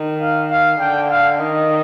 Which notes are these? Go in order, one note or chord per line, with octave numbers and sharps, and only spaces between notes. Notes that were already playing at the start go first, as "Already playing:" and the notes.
Already playing: D#3
F5
F5
D3 G5
F5
D#3 D#5